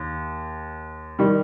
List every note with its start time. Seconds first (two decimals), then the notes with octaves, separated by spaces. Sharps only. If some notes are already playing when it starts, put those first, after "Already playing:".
Already playing: D#2
1.19 D#3 G3